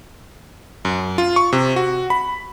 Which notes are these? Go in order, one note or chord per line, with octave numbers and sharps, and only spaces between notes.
F#2
F4
C#6
C3
F#4
B5